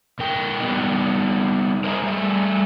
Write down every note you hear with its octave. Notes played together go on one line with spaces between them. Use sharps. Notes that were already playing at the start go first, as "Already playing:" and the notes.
A#2 A#4 G5
G3 B3 D#4
A#4 C5 D#5 E5 G#5 A#5
G3 A3